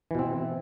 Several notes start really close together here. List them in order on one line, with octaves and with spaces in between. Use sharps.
E3 B2 C4